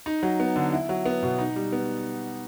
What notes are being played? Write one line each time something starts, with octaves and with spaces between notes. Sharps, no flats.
D#4
F#3
B3
D3
E4
F#3
B3
B2
D#4
G3
B3